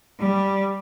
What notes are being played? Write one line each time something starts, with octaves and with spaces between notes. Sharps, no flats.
G3